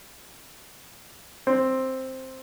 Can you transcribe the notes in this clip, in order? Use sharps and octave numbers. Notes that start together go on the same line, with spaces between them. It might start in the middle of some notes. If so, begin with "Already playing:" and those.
C4